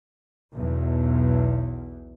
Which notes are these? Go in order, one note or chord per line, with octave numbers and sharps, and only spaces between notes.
B1 E2